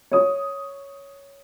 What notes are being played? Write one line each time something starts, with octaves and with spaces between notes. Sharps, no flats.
C#5 D#6